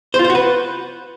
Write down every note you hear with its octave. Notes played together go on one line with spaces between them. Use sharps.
C5
F4
C5
F#4
B4